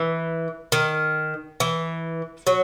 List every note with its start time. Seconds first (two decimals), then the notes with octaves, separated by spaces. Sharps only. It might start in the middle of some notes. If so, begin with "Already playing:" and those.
Already playing: E3
0.72 D#3
1.60 E3
2.47 F#3